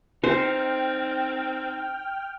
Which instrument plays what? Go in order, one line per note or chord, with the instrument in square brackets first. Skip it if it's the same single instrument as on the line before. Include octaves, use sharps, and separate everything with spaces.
[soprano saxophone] C4 [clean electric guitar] D#4 [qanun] C5 [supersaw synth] G5 F6